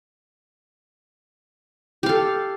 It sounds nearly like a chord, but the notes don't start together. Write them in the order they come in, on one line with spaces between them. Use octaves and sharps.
G4 F5 A4